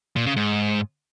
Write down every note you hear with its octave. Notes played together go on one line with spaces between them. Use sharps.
A#2
C#3
G#2